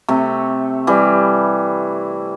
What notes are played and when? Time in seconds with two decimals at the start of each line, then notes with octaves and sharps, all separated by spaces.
0.09 C3 A3
0.87 E3 G3